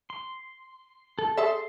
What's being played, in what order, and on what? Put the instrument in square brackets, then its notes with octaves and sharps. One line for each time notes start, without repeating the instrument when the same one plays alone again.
[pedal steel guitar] C6
A4
[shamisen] G#4 A4 E5 [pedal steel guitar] C6